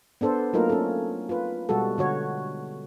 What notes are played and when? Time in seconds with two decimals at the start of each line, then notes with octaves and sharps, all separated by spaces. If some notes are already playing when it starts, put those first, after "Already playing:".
0.21 B3 D4 A4 C5
0.53 F#3 A3 A#3 D#4 F4 A#4
0.69 C#4 A4
1.29 F4 B4
1.69 B2 G3 G#3 F#4 A4
1.98 D3 F#4 C#5